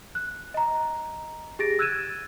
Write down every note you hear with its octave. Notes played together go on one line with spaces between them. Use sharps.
F#6
D#5 A#5
G4 G#4 A6 A#6 D7
E6 F#6 G#6 A6 D#7 E7